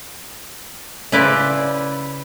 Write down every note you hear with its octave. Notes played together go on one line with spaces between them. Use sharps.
C#3 E4 B4 C5 D5